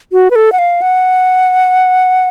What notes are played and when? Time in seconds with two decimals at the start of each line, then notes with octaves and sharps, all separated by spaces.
0.12 F#4
0.31 B4
0.36 A4
0.52 F#5
0.59 F5
0.82 F#5